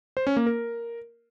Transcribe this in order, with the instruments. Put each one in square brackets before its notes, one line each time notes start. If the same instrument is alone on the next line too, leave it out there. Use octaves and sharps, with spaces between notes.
[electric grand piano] C5
C#4
A#3
A#4